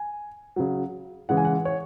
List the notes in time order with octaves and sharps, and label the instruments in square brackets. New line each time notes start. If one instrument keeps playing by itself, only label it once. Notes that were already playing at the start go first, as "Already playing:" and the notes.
Already playing: [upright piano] G#5
C#3 F#3
C#3 E3 G#3 F#5
G#5
F#5
C#5